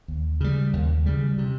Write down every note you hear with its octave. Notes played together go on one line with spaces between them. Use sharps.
D#2
C#3 G3
D#2
C#3 G3
C3